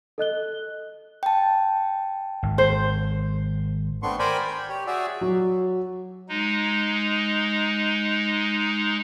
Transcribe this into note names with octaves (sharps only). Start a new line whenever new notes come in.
A4 D#5 F#6 G7
G5 A5
G#1
C5
A3 B3 C4 D4 C6 C#6
A#4 C5 D5 G5 G#5 B5
G5
G4 C#5
F#4 G#4 D5 E5
F#3
G#3 D#4